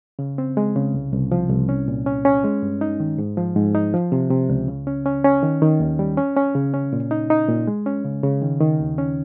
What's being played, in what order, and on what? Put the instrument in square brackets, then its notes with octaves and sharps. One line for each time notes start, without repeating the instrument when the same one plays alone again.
[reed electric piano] C#3
C4
G#3
C#3
C2
C2
F3
C2
C#4
A#2
C#4
C#4
G#3
G2
D#4
D#3
G#2
F3
G#2
D#4
F3
C3
C3
C#2
C#3
C#4
C#4
C#4
D#3
D#3
D#2
G3
C#4
C#4
C#3
C#4
A#2
D#4
D#4
A#2
G#3
C#4
C#3
C#3
D#3
D#3
D#2
C#4